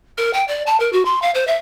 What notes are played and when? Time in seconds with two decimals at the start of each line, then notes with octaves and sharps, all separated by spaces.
0.18 A#4
0.33 G5
0.48 D5
0.66 A5
0.80 A#4
0.93 F#4
1.05 C6
1.22 F5
1.35 C5
1.47 E5